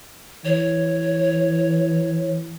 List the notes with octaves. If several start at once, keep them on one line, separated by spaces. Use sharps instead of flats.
E3 C#5